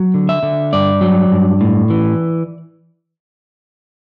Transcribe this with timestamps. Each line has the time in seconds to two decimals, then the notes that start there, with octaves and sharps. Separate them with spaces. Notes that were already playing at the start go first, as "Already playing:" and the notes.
Already playing: F#3
0.14 D3
0.29 E5
0.43 D3
0.73 G2 D5
1.01 F#3
1.32 G2
1.61 A2
1.90 E3